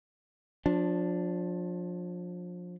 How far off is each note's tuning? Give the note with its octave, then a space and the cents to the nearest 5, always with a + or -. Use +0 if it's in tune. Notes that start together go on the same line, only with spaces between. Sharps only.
F3 +30 D4 -5